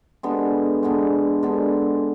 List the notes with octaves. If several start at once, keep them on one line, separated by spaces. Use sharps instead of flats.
G#3 B3 D4 A4
G#3 B3 D4 A4
G#3 B3 D4 A4